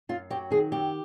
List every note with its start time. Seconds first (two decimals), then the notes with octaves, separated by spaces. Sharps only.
0.09 F#2 F4
0.30 F#3 G4
0.51 D#3 G#4
0.72 F#2 G4